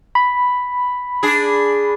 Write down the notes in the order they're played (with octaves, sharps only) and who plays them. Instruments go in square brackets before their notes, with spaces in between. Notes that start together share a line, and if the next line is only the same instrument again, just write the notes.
[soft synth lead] B5
[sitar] D4 G#4